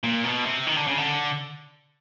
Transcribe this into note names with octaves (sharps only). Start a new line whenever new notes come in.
A#2
B2
C3
D#3
D3
C#3
D3